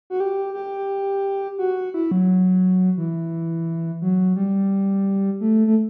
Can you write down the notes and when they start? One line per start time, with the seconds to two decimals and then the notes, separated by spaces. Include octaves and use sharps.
0.10 F#4
0.20 G4
0.54 G4
1.58 F#4
1.94 E4
2.11 F#3
2.98 E3
4.02 F#3
4.36 G3
5.41 A3
5.67 A3